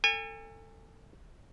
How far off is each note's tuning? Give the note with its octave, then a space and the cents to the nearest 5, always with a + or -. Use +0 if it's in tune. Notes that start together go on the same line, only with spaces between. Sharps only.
A4 +25 G#5 -30